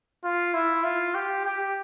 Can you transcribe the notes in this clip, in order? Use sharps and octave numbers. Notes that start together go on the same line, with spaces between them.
F4
E4
F4
G4
G4